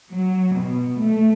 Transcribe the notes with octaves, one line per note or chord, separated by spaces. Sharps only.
F#3
B2
A3